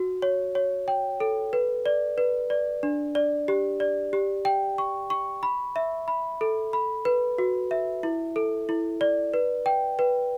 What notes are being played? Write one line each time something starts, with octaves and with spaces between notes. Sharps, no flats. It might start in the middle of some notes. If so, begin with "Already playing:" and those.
Already playing: F#4
C#5
C#5
G5
A4
B4
D5
B4
D5
D4
D5
G4
D5
G4
G5
C#6
C#6
B5
E5
B5
A4
B5
B4
F#4
E5
E4
A4
E4
D5
B4
G5
B4